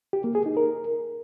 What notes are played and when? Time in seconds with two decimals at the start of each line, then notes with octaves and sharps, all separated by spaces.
0.13 G4
0.24 A#3
0.35 G#4
0.46 D#4
0.57 A#4